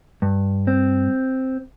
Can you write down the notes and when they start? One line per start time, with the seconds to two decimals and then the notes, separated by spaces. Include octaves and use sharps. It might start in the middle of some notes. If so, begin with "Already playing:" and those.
0.22 G2
0.67 C4